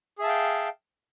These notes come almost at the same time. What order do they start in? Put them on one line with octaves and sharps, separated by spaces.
G#4 E5 A5 F5 G5